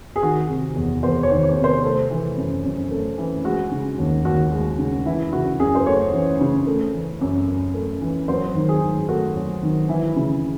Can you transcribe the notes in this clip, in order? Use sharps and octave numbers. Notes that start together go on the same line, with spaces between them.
G#4
D#3 F#4
C3
E2
E2 C5
C#5
D#3
C#5
C3
C5
A3 A4
E3
F#2
F#2
A3
E3
G#3 F#4
C#3
D#2
D#2 F#4
G#3
C#3
E3 E4
C#3 F#4
F#2 G#4
C5
A3 C#5
E3
C#3
A3
E3
F#2
F#2
A3
E3
F#3 C5
D#3
G#4
G#2
A3 F#4
F#3
D#3
E3 E4
C#3